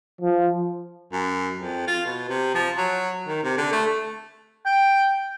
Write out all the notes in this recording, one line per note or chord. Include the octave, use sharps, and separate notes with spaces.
F3
F#2
F2
F4
B2
C3
F3
F#3
D#3
C3
D3
A3
G5